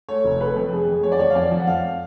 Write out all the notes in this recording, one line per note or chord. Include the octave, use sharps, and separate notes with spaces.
A3 C#5
F1
A3 B4
F2
F2 G#4
F2
F2 C#5
D5
F3 C#5
F5
F2 D5
F3
F#5
F2 F5